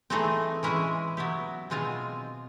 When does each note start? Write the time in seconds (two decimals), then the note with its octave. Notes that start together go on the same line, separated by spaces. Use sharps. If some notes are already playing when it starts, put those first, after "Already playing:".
0.10 E3 A3 C4 D#4 G#4
0.63 E3 G#3 C#4 E4 G#4
1.17 F#3 B3 E4 G4
1.70 B2 G#3 C4 F4 G#4